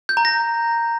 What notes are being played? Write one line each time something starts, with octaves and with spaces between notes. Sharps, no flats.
G6
A#5
A#6